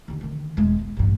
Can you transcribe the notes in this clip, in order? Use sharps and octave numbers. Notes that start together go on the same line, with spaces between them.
D#2 D3
D3 D#3
E1 G#3
B3
A1 G2